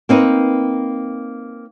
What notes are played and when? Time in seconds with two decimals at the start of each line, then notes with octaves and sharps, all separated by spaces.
0.09 A#3 C4 D#4 B4